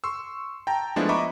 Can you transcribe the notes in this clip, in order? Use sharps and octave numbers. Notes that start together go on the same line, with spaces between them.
C6 C#6 E6
G5 A5 A#5
F3 G#3 A3 B3 D4 E4
D#5 E5 A#5 B5 C#6 D6